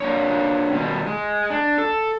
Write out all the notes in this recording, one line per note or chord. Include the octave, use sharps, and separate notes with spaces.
A#3 D4 C#5
B2 D#3 G3
G#3
D4
A4